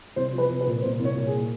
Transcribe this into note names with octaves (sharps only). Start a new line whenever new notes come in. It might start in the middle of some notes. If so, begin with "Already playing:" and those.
C2 C5
F3
B4
C2
B4
A#2
C2 C5
C2
C#5
A#2
G#4
A#2